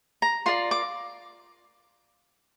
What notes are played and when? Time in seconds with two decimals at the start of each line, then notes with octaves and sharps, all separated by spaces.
0.22 A#5
0.46 F4 A#4 D5 C6
0.71 D6